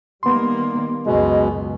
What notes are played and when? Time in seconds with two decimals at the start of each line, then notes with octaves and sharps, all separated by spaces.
0.23 D#3 G3 A#3 B3 C6
1.06 C#2 F#2 B2 G#3